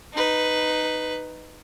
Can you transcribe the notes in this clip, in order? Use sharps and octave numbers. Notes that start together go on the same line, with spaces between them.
D#4 B4